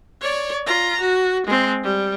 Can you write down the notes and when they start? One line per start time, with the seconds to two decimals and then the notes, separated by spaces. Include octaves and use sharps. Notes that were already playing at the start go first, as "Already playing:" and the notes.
0.21 C#5 D5
0.66 F4 A#5
1.00 F#4
1.46 G#3 C4
1.84 G3